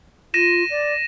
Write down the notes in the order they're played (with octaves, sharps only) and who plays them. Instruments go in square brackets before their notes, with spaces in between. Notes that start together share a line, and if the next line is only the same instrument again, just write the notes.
[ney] F4 [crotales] A#6 D#7 E7
[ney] D5